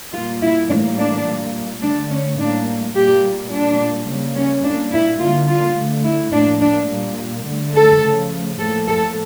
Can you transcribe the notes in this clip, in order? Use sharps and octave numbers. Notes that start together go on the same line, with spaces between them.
A#2 G3 A#3 F4
E4
A2 E3 G3 A#3 D4
D4
A#2 G3 A#3
D3 A3 D4
C#4
A2 G3 A#3 D4
A#2 G3 A#3 G4
A#2 G3 A#3 D4
C#3 G3 A#3
C#4
A#2 G3 A#3 D4
E4
D3 G3 A#3 F4
F4
D3 A3
E4
A2 F3 A#3 D4
D4
A#2 G3 A#3
D3 A3
A4
C#3 F3 A3
A2 F3 A#3 A4
A4